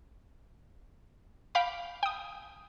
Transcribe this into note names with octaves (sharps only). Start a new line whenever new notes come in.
F5 G5 B5 D6
G5 D#6